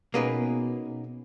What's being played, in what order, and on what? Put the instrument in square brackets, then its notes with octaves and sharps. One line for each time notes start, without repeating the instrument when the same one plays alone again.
[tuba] B2 [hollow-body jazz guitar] A#3 G#4 B4 [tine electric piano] B3 C#4 D#4